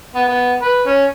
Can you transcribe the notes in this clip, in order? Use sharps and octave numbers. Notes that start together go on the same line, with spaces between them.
B3
B3
B4
C#4